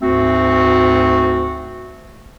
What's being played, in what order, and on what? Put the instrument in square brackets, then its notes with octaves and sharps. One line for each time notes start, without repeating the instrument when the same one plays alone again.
[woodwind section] D2 G#2 A3 C4 F#4